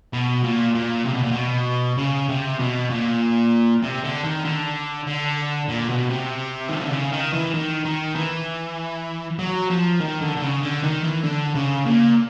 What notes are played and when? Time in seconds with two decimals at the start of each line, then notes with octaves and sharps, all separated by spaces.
0.13 B2
0.43 A#2
0.74 A#2
1.05 C3
1.14 B2
1.23 A#2
1.31 B2
1.98 C#3
2.29 C3
2.59 B2
2.90 A#2
3.83 C3
4.04 D3
4.24 D#3
4.45 D3
5.07 D3
5.69 A#2
5.89 B2
6.09 C3
6.69 D#3
6.80 D3
6.92 C#3
7.12 D#3
7.33 E3
7.54 D#3
7.85 D#3
8.15 E3
9.39 F#3
9.70 F3
10.00 D#3
10.21 D3
10.36 D3
10.42 C#3
10.62 D3
10.83 D#3
11.04 E3
11.24 D3
11.55 C#3
11.86 A#2